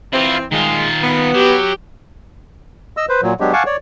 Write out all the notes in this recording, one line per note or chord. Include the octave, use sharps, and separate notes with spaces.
E3 C4 E4 F4
D#3 G#3 F4
B3
F#3 G4
D#5 E6
B4 C5
A#2 F#3
F#3 G#3 B3 D4 G4
F5 F#5 G#5 A5 C#6 D6
C#5 D5